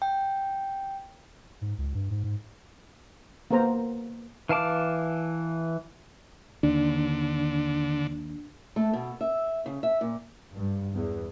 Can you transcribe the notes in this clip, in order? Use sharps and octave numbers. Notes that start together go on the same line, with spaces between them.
G5
G#2
C#2
G2
G#2
G#2
A#3 B3 A#4 C5 A#5
E3 F5 A5 D6
D#2 D3 D4
A3
B2
E5
C#3
E5
A#2
G2
E2